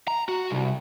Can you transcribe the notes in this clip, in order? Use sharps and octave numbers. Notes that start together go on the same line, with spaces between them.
A#5
F#4
C2